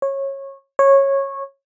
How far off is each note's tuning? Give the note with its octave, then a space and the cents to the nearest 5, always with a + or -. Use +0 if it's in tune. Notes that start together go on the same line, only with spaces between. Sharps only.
C#5 -20
C#5 -15